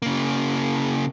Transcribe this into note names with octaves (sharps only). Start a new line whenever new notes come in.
C#3 A#3